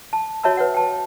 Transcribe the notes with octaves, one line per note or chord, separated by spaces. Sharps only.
A5
F#4 C#5 E5 A5 A#5 E6
B4 C#5 F#5
G5 A5